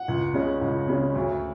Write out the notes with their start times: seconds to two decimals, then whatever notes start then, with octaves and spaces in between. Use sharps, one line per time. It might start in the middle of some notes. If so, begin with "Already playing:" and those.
Already playing: F#5
0.08 C#2
0.34 C#3 G#3 C#4
0.61 C#2
0.88 C#3 G#3 C#4
1.15 D2